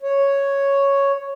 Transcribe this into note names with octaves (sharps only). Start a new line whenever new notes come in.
C#5